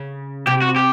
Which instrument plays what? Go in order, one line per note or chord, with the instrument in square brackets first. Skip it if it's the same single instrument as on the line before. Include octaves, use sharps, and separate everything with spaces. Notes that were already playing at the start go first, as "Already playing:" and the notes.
Already playing: [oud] C#3
[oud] C3 [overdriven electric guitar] G4
[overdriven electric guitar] F#4
G4